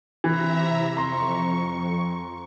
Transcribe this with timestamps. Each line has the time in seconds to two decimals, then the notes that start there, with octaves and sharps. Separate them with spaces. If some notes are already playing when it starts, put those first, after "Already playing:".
0.24 C3 E3 E5 A#5
0.97 F2 A#5 C6 C#6